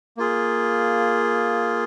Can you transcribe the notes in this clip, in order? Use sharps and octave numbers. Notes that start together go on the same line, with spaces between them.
A#3 F4 G#4